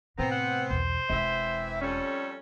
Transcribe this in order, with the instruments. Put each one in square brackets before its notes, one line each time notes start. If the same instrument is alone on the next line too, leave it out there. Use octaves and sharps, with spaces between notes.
[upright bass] A2 C3 [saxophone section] B3 C4 [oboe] A#5
[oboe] F#5
[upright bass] B1 E2 [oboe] C5
[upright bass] E1 G#3 [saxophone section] E3 C4 E5
[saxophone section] F2 G3 C#4 [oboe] A4